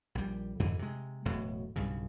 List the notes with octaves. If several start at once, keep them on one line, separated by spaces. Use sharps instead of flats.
A#1 G3
F2 G#2 D3 E3
C3 G#3
E1 A2 F#3
B1 G2 C#3